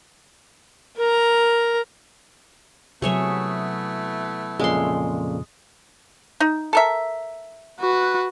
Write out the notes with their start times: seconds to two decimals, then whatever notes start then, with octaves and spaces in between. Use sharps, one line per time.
0.97 A#4 A#5
3.02 C3 F#3 A3 B3 E4 G#4 C#5 E5
4.59 F2 A#2 C#3 G#3 C6
6.40 D#4
6.73 A4 A#4 E5
7.80 F#4 B4